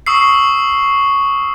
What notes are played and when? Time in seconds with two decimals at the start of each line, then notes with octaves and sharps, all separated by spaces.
0.06 C#6 D#6 E6 C7